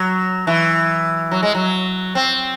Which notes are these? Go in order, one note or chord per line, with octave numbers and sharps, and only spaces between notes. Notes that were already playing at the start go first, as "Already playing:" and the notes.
Already playing: F#3
E3
F#3
G#3
F#3
C4